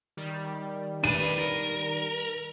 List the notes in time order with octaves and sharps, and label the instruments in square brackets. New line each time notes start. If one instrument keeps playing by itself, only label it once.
[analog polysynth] D#3 G3
[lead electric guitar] D4 B4 [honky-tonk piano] D#7
[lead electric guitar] A#4